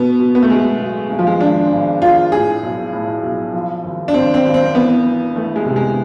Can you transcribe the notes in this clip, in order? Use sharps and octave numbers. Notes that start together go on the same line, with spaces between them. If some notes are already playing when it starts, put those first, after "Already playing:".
Already playing: B2 B3
B2
B3
A3
B2 G#3
B1
G#1 G#3
F3
G#3
G#1 D4
G#1
G#1 F4
A2 G#4
B1
A2
B1
F3
G#1
D4
G#1 C4
C4
G#1
C4
E3 B3
E3
E3 A3
G#3
C3
G#3